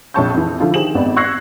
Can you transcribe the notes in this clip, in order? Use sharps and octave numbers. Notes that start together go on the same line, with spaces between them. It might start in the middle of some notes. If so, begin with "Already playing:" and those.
A#1 F2 C#5 A5 C#6 G6
F2 E3
D3 F3 E4 F4
D#3 G4 G#4 C5 E7 F#7
G#1 B3 C4 D5
C#6 E6 F#6 G#6 A#6 C7